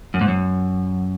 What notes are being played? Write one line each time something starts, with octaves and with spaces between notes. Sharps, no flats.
F#2
G#2
F#2